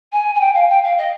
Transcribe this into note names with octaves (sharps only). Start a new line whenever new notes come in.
G#5
G#5
G5
F5
G5
F5
D#5